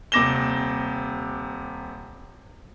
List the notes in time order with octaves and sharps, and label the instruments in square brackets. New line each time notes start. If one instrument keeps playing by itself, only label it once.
[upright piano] D#1 C3 D6 A#6 E7 G7